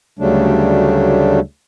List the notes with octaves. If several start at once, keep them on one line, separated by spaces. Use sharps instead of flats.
D2 C#3 F#3 G3 A3 D4